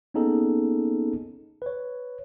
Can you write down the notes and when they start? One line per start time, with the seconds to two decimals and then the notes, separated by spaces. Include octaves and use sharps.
0.14 A#3 B3 C#4 D#4 G#4 A4
1.62 B4 C#5